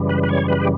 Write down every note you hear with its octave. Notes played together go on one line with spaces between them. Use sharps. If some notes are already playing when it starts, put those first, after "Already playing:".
Already playing: F#2 C#3 E3 G3
B4
B4
C#5
B4
G4